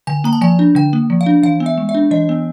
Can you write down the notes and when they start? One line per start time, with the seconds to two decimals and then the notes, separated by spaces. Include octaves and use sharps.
0.07 D3 G#5
0.24 A#3 A#5
0.33 A5
0.41 F3 G#5
0.59 D4
0.75 D3 G5
0.93 A#3
1.10 F3
1.21 F5
1.26 D4
1.43 E3 F5
1.60 B3
1.66 E5
1.78 G#3
1.89 E5
1.94 D4
2.11 E3 D#5
2.29 B3